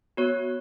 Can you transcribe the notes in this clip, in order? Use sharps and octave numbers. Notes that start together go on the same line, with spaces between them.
B3 F#4 C#5